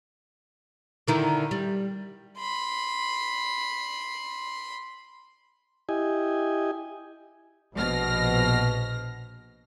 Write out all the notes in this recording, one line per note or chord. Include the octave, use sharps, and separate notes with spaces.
D3 D#3 E4
G3
B5 C6
E4 G4 D#5 G#5
A#1 B2 F6 A#6